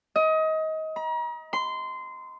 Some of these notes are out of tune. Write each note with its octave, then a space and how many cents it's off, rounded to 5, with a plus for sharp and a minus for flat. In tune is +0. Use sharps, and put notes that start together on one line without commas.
D#5 +25
A#5 +40
C6 -20